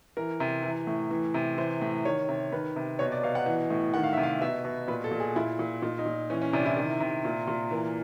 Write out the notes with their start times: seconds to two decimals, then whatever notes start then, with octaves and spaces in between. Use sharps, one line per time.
0.17 E3 A#4
0.40 C3
0.63 E3
0.87 A2
1.11 E3
1.34 C3
1.58 E3 C5
1.82 A2
2.05 D#3 C#5
2.29 C3
2.52 D#3 B4
2.76 C3
2.99 B2 C#5
3.12 D5
3.23 B2 F5
3.35 F#5
3.46 E3
3.70 A2
3.94 D#3 F#5
4.04 F5
4.13 C3 E5
4.23 F5
4.41 B2 E5
4.65 B2
4.88 A#2 B4
5.04 A4
5.11 A#2
5.20 G#4
5.36 A#2 E4
5.59 A#2
5.82 A#2 D#4
5.99 D#4
6.06 A#2
6.30 E3 C#4
6.42 C#4
6.53 C3 D4
6.66 E4
6.77 D#3
7.00 C3
7.25 A#2
7.48 A#2
7.71 E3 A#4